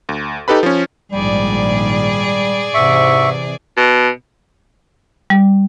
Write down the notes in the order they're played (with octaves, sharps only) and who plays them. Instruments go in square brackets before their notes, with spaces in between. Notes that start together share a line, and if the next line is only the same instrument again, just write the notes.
[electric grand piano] D2
D#4 G4 A4 B4 B5
F3 C#4
[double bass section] A#1 G#2 D#3 [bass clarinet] G3 [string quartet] G#4 D5
[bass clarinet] G#2 [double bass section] C3 E3 [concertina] E5 C#6
[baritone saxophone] B2
[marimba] G3